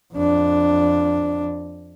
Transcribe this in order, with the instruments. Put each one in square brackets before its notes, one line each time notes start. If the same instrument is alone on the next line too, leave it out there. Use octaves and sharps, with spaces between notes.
[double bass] F2 D4